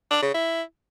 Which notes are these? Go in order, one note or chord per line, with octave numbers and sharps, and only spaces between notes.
D4
C#3
E4